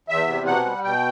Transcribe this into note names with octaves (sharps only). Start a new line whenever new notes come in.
E2 E5
C3
B2 F#5
G3
B2 G5